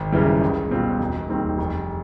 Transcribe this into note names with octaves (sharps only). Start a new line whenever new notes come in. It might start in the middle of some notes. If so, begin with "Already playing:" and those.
Already playing: G#1
F#2 C#3 E3 G3
C#2
B2 G3 C4 F4
E1
D#2 D#3 G3 C4
F1